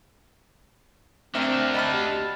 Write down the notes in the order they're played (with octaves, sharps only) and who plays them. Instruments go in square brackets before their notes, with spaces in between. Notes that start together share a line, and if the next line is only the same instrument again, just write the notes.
[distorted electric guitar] D2 D3 [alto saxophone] C4 [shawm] A#4 [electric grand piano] E5
[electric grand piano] D#5 B5 F6 [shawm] A5
[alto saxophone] G4